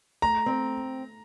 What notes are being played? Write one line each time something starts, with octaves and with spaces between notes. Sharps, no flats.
A3 A#5
C4